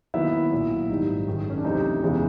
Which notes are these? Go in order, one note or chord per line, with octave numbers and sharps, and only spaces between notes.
D#2 D#3 F#3 B3 E4
B1 A#2 F#3
G#1 G#2 D#3 G3 D#4
F#2 D#3 G#3
C#4
D4
D2 C3 E3 A3 D#4
E2 C#3 E3 G#3 B3